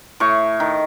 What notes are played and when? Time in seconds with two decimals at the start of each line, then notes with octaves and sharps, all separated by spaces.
0.20 A2 C#6
0.60 D#3